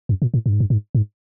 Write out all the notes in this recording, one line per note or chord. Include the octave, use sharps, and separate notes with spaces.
F#2
A#2
A2
G2
G#2
G2
G#2
G#2